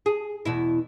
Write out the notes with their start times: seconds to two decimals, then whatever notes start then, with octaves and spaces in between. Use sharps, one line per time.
0.06 G#4
0.45 E2 B2 E4